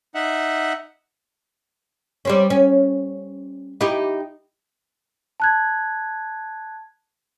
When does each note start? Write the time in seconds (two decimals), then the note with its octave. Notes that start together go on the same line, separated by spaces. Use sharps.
0.15 D#4 E5 F#5
2.25 G3 C4 C#4
2.50 C#4
3.81 D#4 E4 G4
5.40 A5 F#6 G#6